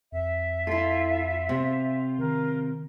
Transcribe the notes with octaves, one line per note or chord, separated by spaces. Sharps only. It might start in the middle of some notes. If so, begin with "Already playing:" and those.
F2 E5
E4 F4 A4
C3
D#3 A#4